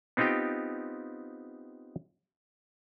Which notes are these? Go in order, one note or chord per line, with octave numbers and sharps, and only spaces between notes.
B3 C4 D#4 F4 G4 G5